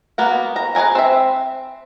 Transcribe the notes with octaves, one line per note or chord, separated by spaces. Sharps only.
A#3 B3 F#4
A#5
G#4 B4 D5 G#5 A#5
C4 E5